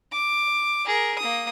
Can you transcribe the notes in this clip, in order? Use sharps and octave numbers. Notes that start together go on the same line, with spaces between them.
D6
G#4 A#4
A#3 D#6